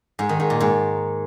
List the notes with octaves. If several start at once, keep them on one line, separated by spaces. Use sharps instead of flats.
G#2
D#3
G#2
A#2
G#2